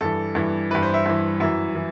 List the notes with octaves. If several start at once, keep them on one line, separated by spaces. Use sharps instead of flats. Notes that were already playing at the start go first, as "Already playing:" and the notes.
G2 E3 A4
G2 E3
G2 E3 B4
C5
E5
G2 E3
F#2 E3 E5
E3